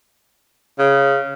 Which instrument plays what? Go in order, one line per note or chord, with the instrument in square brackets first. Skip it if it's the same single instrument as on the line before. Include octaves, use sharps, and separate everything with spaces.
[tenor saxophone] C#3